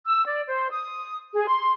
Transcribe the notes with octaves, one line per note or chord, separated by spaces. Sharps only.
E6
D5
C5
D#6
G#4
C6